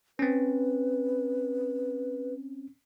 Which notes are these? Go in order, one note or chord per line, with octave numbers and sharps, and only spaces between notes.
C4 C#4 B4